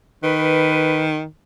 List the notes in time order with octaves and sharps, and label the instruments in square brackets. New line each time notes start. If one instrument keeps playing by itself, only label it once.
[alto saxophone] D#3 [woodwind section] B4